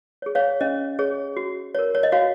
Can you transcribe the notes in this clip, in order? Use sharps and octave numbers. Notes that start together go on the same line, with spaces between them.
G#4 C#5
C#5 F5
C#4 D#5
G#4 C#5
F#4
A#4 C#5
C#5
D#5
F#4 C#5 F5